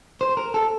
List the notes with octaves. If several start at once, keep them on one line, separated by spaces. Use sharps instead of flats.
C5
A#4
A4